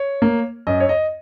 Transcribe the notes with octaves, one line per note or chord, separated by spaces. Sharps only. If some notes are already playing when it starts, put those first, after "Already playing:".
Already playing: C#5
A#3
F#2 D#5
C#5
D#5